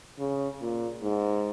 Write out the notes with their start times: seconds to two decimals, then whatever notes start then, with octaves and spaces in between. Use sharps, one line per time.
0.19 C#3
0.61 A#2
1.02 G#2